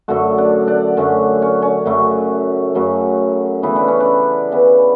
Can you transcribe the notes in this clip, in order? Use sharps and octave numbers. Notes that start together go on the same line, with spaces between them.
F#2 D3 A3 F#4 A4
D4
D4
F#2 D3 A3 C#4
C#4
C#4
F#2 C#3 F#3 A3
F#2 C#3 F#3 A3
C#3 E3 B3 E4
D4
C#4
D4
C#3 E3 B3